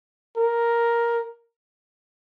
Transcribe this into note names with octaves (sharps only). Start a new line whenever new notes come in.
A#4